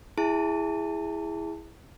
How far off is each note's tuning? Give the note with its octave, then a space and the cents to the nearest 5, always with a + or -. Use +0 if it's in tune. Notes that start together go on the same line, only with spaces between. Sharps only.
E4 +0 G#4 -10 A5 +30